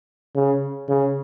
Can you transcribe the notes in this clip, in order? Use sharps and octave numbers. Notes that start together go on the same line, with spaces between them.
C#3
C#3